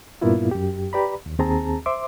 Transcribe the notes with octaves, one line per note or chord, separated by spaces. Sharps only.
G2 A#2 A#3 B3 E4 F4
F#2 G4
G4 B4 D5 A#5 B5
D#2
D#2 C4 G#4 A5 A#5
C5 E5 C6 D6